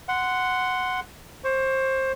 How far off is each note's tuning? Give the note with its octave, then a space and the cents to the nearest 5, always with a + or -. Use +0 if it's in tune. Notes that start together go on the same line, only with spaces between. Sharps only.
F#5 +0 C6 -10
C5 +20 C#6 +20